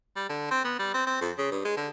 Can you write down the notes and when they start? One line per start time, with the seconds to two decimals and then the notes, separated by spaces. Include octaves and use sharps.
0.16 G3
0.29 D3
0.51 C4
0.64 B3
0.79 G3
0.94 C4
1.06 C4
1.21 F2
1.38 C#3
1.51 G2
1.65 G#3
1.77 D3